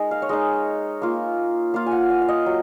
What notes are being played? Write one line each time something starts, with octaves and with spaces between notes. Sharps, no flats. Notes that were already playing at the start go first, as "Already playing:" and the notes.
Already playing: G#3 D#4 A#4
F5
C#5
G#3 D#4 D#5
A#3 F4
A#3 F4 F5
G#5
F#5
F5
F5
D#5
F#3